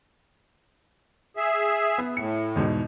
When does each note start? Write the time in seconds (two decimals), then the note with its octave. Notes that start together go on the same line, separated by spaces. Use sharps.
1.37 G#4 E5
1.98 B3
2.17 A2 C#7
2.56 E2 G#2 B2